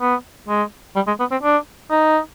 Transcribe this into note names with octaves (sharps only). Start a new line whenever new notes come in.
B3
G#3
G3
G#3
B3
C4
D4
D#4